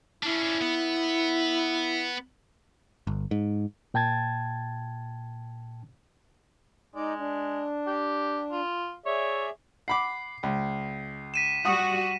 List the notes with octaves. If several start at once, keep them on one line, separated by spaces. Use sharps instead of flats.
C#4 D4 E4
B3
G1
G#2
A#2 G5 A5 G#6 A6
G#3 D#4 D5
D4
G4
F4
G#4 C#5 D5 E5
F#5 B5 D6 C7
C#2
B6 D#7 E7
G3 F#4 F#5 D#6